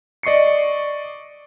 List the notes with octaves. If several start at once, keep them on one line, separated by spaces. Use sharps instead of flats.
D5 D#5 C#6 C7 C#7